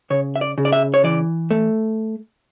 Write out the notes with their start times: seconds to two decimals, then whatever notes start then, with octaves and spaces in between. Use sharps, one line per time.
0.10 C#3 C#5
0.36 E5
0.41 D5
0.58 C#3
0.65 D5
0.73 E5
0.94 C#5
1.04 E3 D5
1.51 A3